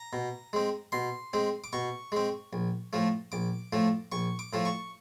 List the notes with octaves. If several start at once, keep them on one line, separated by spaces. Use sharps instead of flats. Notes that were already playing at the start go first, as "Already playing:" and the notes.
Already playing: A#5
B2
G#3 C4
B2 C6
G#3 C4
D6
B2 C#6
G#3 C4
A#1
A2 F3 A3
A#1 D6
A2 F3 A3
A#1 C#6
D6
A2 F3 A3
C#6